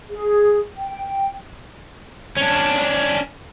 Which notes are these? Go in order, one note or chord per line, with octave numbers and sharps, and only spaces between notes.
G#4
G5
C#4 D4